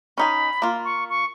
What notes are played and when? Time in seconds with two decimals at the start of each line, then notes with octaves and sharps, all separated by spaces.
0.18 C#4 D#4 G#5 B5
0.62 A#3 F4
0.85 C#6
1.10 C#6